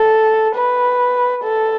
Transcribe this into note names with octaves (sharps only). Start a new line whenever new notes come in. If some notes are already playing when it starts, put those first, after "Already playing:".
Already playing: A4
B4
A4